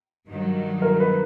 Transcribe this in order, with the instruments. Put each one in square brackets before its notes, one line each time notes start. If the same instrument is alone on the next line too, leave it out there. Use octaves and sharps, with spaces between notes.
[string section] G2 D#3 F#3
[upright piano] A#4
B4